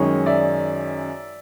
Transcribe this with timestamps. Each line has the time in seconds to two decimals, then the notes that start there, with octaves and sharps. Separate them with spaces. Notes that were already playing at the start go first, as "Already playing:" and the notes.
Already playing: F#2 D#3 G#3 C#5 D#5
0.26 D5 E5